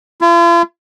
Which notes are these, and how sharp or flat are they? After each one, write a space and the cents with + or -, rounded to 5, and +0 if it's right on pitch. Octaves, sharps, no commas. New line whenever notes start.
F4 -45